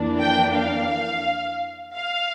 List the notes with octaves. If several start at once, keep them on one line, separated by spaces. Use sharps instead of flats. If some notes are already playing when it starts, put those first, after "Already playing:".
Already playing: F2 E3 A#3 D4
G5
F5
F5